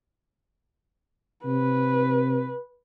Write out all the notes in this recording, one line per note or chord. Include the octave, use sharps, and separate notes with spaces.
C3 B4